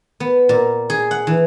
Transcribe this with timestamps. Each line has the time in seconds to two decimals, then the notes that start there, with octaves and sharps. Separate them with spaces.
0.20 B3
0.49 A#2
0.90 G#4
1.11 F#5
1.27 E3